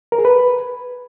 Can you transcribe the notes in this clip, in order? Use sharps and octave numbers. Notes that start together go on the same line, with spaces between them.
A#4
G#4
B4